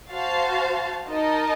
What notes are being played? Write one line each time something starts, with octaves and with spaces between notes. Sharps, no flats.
F#4 C5 F5 A5
D#4 A#4 D#5 A5